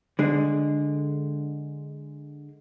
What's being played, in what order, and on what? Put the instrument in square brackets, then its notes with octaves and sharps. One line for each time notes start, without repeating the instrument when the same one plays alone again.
[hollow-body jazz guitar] D3 G#3